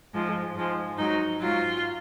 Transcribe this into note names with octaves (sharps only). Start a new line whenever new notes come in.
G#2 F3 G#3
G#2 F3 G#3
G#2 F#3 D#4
G#2 F#3 F4